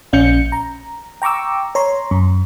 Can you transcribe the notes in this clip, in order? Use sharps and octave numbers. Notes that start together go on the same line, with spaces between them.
A#1 C#4 G6 C#7
A#5
G5 A#5 C#6 D6 E6
C#5 A#5 C6
F#2